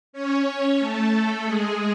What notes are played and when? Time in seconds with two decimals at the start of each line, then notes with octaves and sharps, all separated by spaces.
0.13 C#4 C#5
0.80 A3 A4
1.45 G#3 G#4